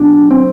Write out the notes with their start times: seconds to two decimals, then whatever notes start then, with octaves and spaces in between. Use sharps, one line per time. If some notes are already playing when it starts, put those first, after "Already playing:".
Already playing: B1 B2 D4
0.31 C4